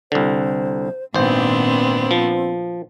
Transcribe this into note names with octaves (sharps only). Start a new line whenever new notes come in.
C2 D3 C5
G#1 A#2 B3 C4 D4 C5
F3